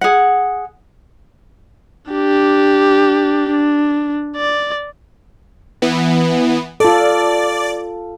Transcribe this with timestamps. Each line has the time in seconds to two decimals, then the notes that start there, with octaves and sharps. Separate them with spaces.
0.01 G#4 F#5
2.12 D4 G4
3.50 D4
4.37 D5
5.82 E3 B3
6.80 F4 A4 D5